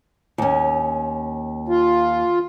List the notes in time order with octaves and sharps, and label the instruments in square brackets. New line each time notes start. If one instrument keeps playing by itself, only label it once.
[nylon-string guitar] D#2 C#4
[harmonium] F4